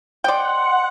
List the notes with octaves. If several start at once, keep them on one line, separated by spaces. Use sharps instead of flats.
C5 D5 D#5 F#5 G5 C6